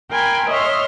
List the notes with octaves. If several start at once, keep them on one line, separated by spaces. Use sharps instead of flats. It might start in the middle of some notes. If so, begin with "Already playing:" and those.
A#4 G5 G#5 B5 C6
C#5 D#5 E5 C6 F6